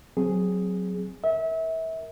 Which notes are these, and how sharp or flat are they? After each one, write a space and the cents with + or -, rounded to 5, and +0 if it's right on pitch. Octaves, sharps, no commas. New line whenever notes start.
F#3 +0 C4 -10 G#4 +0
A#4 +0 E5 -30